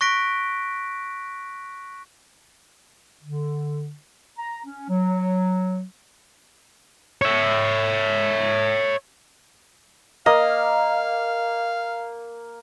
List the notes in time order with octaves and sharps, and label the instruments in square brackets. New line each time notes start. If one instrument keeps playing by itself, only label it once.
[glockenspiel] C#6 F#6 A#6 B6 D7
[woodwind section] D3
A#5
C#4
F#3
[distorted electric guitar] C#5 E5
[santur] A#3 [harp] D#5 [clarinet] F5